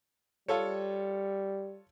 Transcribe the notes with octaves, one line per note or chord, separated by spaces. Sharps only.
G3 F4 A4 C#5